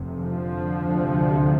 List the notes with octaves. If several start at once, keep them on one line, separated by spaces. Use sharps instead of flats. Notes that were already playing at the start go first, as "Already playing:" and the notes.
Already playing: F1 F2 C3
D3 F3
D2 C3